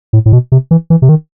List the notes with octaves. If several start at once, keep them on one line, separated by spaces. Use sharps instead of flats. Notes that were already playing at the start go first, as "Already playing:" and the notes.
A2
A2
B2
C3
E3
E3
C3
D#3